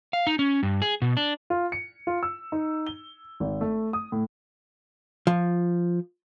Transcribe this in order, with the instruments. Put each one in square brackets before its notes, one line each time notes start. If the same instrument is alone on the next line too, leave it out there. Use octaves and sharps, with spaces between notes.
[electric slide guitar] F5
D#4
C#4
G2
G#4
B2
D4
[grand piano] F4
C#7
F4
E6
D#4
G7
G#1
A3
D#6
A2
[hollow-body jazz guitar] F3